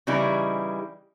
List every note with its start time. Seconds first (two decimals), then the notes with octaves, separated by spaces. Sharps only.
0.07 C#3 E3 G3 D#4 E4